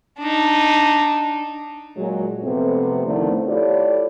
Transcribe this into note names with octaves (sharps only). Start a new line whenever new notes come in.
D4 D#4
A#2 F#3 G#3
F2 C3 A3 B3 C4
D3 D#3 F3 A3 D4 E4
E4 F4 G4 A4 C#5 D5